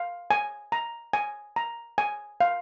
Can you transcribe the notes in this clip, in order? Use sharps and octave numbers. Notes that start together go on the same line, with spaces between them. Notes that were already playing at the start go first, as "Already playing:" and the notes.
Already playing: F5
G#5
A#5
G#5
A#5
G#5
F5